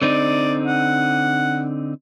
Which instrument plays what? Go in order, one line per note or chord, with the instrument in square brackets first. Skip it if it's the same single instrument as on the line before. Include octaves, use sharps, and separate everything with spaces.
[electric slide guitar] D3 C4 D#4 [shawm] D5
[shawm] F#5